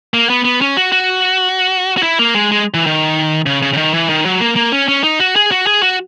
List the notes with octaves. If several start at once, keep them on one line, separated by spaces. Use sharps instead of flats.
A#3
B3
B3
C#4
F#4
F#4
F#4
E4
A#3
G#3
G#3
E3
D#3
C#3
C#3
C#3
D#3
E3
D#3
F#3
A#3
A#3
C#4
C#4
D#4
F#4
G#4
F#4
G#4
F#4